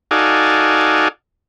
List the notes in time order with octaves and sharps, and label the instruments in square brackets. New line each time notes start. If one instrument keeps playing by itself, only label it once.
[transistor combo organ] D#4 F#4 A4 D5 F5 G#5